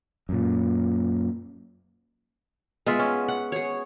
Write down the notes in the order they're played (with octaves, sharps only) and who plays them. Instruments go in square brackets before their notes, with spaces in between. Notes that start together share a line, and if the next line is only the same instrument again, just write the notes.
[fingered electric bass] F#2 A#2
[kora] G#3 F4 E5 [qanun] B3
[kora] C#4
F#5
[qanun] G#4 C#5